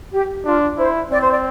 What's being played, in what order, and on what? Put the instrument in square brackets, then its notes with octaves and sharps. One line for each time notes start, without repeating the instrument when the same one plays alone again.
[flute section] G4
[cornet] D4 [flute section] F4
[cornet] E4 [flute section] C5
[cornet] C4 [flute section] D5
[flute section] C5
D5